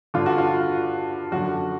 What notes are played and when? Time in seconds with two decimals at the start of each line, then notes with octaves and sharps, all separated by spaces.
0.14 G2 D3 F4
0.26 F#4
0.38 F4
1.32 F#2 D3 F#4